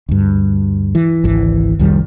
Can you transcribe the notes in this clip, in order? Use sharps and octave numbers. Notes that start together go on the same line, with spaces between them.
D2 G2
E3
G#1 C#2 E3
C2 F2 D#3 G3